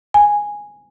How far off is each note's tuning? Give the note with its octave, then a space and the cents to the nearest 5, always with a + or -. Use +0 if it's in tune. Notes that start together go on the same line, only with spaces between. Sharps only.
G#5 -5